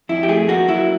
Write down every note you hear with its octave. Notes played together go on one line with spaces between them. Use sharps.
F2 E4
G4
A3 G#4
A#3 F#4
F#3 E4